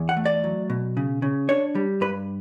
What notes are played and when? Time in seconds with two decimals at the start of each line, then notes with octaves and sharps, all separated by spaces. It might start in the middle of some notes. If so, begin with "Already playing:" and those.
Already playing: E2
0.09 F#5
0.17 A3
0.26 D5
0.44 F#3
0.70 B2
0.97 C#3
1.22 C#3
1.49 D4 C#5
1.75 G3
2.01 G2 B4